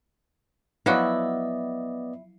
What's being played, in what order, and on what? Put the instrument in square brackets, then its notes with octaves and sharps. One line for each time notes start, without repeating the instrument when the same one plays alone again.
[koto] F3 F#3 F#4 [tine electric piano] B3 D5 D#5 [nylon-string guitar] E4